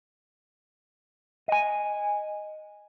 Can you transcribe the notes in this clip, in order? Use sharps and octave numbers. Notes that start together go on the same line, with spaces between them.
D#5 G#5